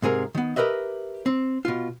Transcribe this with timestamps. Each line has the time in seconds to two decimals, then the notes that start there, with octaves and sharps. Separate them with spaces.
0.02 G#2 C3 G#4 A#4
0.35 D#3 B3
0.56 G4 A#4 B4 D#5 E5
1.26 C4
1.65 B2 F4